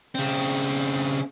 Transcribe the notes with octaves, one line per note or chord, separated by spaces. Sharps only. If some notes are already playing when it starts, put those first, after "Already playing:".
C#3 C4